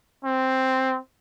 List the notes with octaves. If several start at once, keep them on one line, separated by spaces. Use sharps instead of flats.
C4